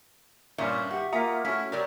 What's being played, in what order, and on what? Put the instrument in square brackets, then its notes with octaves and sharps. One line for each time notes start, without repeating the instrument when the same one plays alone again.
[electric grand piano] G2 D#3 [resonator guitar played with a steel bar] A#2 [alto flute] C#4 [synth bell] E5 C#6 B6
[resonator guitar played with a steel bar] F#4 [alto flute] G4
[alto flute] A#3 [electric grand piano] F4 A#5 D#6 [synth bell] E5 G#5 B6
[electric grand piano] A3 F#4 [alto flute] C#4 [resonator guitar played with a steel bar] E4 [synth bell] B6
[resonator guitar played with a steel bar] F#3 G3 G4 [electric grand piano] A#4 [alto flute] D5